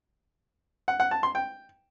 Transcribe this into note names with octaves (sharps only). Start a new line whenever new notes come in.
F#5
F#5
A5
C6
G5